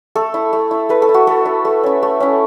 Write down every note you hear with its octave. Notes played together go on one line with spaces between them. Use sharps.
A3 A4
E4
A3
E4
A3 B4
A4
E4
F#4
A3 A4
E4
A3
C#4 E4
A3
C#4 E4